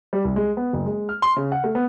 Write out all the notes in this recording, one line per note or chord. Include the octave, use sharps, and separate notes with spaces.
G3
C2
G#3
B3
F#1
G#3
F6
C6
C#3
F#5
A3
B3